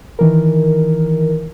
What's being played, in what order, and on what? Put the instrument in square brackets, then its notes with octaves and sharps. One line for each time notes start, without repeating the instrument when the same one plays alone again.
[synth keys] D#3 E3 A#4